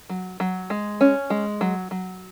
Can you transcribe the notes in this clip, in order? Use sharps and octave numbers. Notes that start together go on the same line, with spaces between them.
F#3
F#3
G#3
C#4
G#3
F#3
F#3